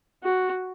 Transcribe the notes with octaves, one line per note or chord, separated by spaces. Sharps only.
F#4